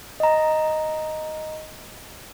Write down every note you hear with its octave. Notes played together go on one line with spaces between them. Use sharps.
D#5 A#5